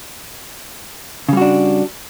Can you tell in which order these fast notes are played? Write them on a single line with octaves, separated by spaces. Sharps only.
C#3 G3 F#4 D4